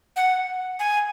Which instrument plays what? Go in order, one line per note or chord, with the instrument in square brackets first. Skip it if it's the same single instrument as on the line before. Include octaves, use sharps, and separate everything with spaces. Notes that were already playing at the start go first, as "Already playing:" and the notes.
[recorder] F#5
G#5